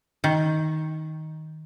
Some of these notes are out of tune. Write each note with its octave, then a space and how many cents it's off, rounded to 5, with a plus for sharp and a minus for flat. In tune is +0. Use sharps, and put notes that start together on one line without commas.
D#3 +10